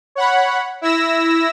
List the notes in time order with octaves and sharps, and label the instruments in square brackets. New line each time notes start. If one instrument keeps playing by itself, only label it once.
[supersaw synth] C#5 F#5 B5
E4 E6 A#6